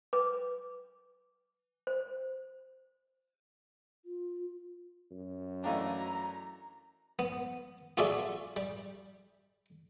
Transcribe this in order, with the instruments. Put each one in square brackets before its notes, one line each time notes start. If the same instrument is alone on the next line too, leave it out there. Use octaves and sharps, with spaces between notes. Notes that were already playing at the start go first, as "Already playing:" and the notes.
[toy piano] B4 D6
C5
[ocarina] F4
[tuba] F#2
[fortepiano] E3 A3 D4 [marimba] D#5 F5 G5 [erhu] A#5
[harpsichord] B3
F4 F#4 G#4 A4 D5 E5
G3